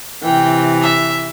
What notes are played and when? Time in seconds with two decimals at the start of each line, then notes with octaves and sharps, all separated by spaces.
0.23 C3 E3 G5
0.82 E5